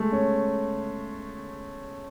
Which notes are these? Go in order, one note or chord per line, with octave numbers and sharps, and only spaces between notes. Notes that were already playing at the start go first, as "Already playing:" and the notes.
Already playing: G#3 A3
C#4